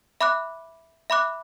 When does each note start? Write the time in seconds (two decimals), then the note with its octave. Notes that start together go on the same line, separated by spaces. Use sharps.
0.21 E5 B5 D6 F#6
1.10 E5 B5 D6 F#6